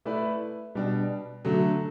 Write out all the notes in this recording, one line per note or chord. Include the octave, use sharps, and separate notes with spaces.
A3 E4 B4 D5
B2 G3 D4
D3 F#3 A3